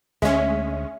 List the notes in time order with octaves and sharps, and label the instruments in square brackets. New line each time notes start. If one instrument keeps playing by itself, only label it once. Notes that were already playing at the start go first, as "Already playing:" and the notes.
[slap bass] D2 A3 [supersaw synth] G#3 C#4 [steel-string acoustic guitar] E5